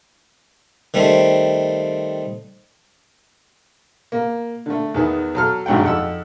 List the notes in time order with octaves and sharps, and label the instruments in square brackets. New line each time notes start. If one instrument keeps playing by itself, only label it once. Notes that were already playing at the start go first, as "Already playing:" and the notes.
[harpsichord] D#3 G3 A3 C4
[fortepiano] A#3
D3 A3
E2 D#3 B3
F#3 A4 F6
G#1 G2 F#3 F#5 G5
F2 F#5 E6